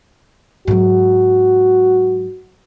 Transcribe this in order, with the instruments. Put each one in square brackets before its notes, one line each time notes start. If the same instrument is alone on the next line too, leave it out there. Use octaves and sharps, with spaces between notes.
[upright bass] G#2 F#3 [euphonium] F#4